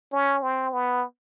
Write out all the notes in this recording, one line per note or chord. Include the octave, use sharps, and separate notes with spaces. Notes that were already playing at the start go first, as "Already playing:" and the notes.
C#4
C4
B3